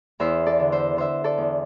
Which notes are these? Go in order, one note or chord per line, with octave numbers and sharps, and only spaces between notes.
E2 C5 E5
A4 D5
D3
C5 E5
D3 C5 E5
A4 D5
E2